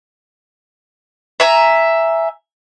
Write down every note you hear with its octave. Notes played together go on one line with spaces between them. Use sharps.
E5 G#5 A#5